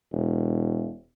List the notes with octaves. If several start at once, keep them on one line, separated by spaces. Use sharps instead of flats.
E1